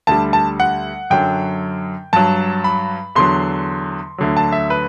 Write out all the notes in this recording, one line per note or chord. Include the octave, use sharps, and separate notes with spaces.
D2 D3 G3 A5
A5
F#5
F#2 D3 F#3 G5
G2 F#3 A5
B5
E2 D3 F#3 C6
D2 D3 F#3
A5
E5
B4